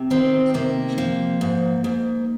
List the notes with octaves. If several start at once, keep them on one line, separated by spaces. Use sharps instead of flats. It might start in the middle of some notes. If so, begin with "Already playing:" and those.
Already playing: C3
D#3 C4
C3 A#3
F3
G#2
G#2